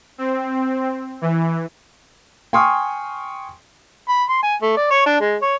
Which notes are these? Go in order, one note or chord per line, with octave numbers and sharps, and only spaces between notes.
C4
E3
G5 G#5 C6 C#6 D#6 F6
B5
C6
G#5
A3
D5
C#5
D4
G#3
C#5